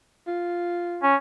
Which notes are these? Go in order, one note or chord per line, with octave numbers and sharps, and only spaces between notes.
F4
C#4